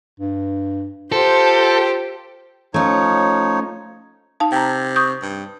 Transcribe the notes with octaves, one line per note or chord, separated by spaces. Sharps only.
G2
F4 G4 A4 C5
F3 A3 C#4 D#4 C#5
D#4 F5 A5
C3 G5 A#5
C#6 D#6 G6
G2